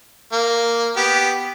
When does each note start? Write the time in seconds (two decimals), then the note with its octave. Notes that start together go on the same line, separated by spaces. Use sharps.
0.32 A#3
0.96 B3 G4